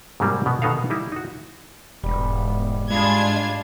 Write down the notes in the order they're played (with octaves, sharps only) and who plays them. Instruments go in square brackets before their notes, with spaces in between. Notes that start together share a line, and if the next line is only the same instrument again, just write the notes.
[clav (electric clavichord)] G#2 C3 F#3 G3 A#3
B2 B3
B2 D#3 B3 D#4 A4 F5
G3 D#4 E4
D#4 F#4
[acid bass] E1 [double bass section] G#2 B3 [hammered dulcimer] G3
[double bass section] G#2 [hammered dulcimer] G3 [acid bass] G#3 [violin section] D4 F4 G#6